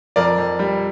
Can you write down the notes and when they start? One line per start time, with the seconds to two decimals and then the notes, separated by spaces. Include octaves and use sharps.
0.16 F2 A#4 D5
0.38 F2
0.59 G3